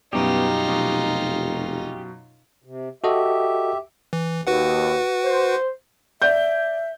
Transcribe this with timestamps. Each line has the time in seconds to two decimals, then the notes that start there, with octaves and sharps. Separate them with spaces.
0.13 F#2 B2 G3 B3 D#4 F4 G4
0.67 F1 F#2 B2
2.64 C3
3.04 F#4 G4 A4 D#5 E5
4.13 E3
4.47 D#2 F#4 B4 F#5
5.25 C5
6.22 D5 E5 G6